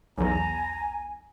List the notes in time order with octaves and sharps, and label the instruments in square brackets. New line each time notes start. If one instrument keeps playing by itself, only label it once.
[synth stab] B1 E2 [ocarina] G#5 [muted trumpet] A#5